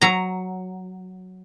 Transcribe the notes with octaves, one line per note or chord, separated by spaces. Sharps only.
F#3 A#5